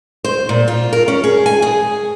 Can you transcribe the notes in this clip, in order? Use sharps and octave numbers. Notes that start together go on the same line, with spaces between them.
C5
A#2
F4
A#4
C#4
G#4
G#5
G#4